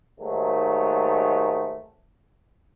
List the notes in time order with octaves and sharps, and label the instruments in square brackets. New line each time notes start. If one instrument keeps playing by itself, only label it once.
[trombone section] D#2 G#2 D#3 F#3 A3